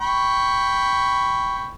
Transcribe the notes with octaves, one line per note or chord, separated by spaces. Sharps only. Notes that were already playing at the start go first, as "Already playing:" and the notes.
G5 B5 C#6